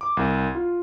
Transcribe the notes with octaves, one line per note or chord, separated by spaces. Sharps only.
D6
C2
F4